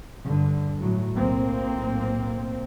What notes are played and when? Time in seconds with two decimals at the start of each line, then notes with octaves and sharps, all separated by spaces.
0.23 G2 D3
0.79 A2 F#3
1.15 B1 A2 A#3 C4